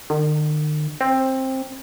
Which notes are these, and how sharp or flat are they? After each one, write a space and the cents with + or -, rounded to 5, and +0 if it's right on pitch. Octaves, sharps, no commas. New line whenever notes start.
D#3 -45
C4 +15